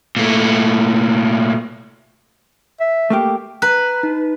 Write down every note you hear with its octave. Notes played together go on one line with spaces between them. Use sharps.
A#2 A3
E5
A3 A#3 G4
B4 A#5 F#6
D#4